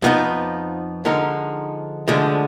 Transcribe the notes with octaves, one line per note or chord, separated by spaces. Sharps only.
F2 F3 B3 D#4
D3 F3 G#3 D#4 A#4
D2 D3 F3 G#3